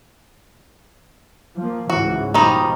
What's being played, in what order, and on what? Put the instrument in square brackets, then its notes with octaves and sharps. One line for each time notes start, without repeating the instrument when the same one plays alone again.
[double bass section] F3 A#3
[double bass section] C#2 G#2 E3 [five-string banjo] F#4
[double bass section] B2 F3 [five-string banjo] D#3 G3 D#4